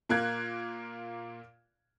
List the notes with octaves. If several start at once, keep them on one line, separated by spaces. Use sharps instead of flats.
A#2 A#3 F#6 G#6